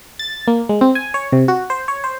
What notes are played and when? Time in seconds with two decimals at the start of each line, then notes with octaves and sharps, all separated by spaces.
0.19 A6
0.47 A#3
0.69 G#3
0.81 C4
0.95 G#5
1.14 C#5
1.32 C3
1.48 F#4
1.70 C5
1.88 C#5
2.04 C5